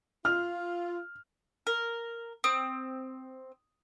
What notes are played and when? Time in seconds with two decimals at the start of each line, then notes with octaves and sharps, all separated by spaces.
0.25 F4 F6
1.67 A#4
2.44 C4 D#6